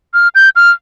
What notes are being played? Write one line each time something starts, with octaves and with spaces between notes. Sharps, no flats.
F6
G6
F6